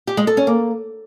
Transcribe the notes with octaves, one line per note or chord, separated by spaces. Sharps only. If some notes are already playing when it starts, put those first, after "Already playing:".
G4
G#3
A4
C#4
A#3